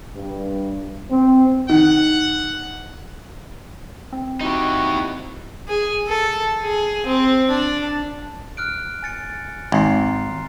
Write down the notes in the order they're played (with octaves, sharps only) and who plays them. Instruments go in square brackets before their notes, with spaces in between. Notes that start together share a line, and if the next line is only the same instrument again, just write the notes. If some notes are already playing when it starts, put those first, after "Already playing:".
[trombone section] G2
C4
[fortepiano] D#3 [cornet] F#5
[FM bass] C4
[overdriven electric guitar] D#4 G4 [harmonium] E4 F#4
[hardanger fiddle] G#4
A4
G#4
C4
D4
[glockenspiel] F6 F#6 D7
G#5 A6 C#7
[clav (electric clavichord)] G#1 [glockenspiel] A#5 C6 C7